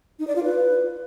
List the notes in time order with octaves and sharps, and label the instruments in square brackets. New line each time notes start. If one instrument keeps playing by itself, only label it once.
[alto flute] D#4
D5
F4
B4